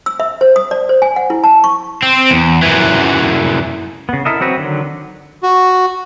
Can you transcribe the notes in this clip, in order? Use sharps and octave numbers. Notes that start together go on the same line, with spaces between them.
E6
E5
C5
D#6
D5
C5
G#5
F#5
E4
A5
C#6
C4
E2
F#2 E3
C#3 B3
E4 A4 A#4 D#5 E5
F#3 C4 F#4 B4
D3 D#3 F#3
F#4